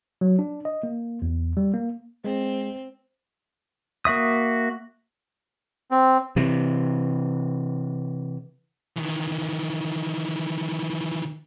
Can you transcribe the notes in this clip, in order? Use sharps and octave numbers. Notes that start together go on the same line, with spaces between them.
F#3
D4
D#5
A#3
E2
G3
A#3
G#3 C4
A#3 F#4 E5 D#6
C4
C3 E3
D#3 E3